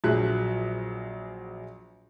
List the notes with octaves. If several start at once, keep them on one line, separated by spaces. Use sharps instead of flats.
A#1 F#3 G#4 E5 F#6